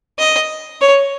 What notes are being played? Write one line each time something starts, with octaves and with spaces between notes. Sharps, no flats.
D#5
C#5